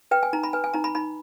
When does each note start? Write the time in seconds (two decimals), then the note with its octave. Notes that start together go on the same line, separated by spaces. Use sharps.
0.11 B4 G5
0.23 G#5
0.33 D#4 A#5
0.43 B5
0.53 B4 G#5
0.64 G#5
0.74 D#4 A#5
0.84 B5
0.95 D#4 B5